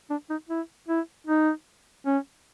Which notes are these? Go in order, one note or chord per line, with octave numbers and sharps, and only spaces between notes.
D4
D#4
E4
E4
D#4
C#4